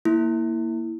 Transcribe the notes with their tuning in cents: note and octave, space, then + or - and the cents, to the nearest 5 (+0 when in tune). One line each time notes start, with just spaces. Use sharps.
A#3 +0 E4 -10